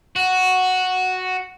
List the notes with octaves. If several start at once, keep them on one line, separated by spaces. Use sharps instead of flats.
F#4